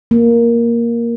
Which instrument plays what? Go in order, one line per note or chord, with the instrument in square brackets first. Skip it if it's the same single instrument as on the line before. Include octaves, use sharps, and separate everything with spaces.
[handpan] A#3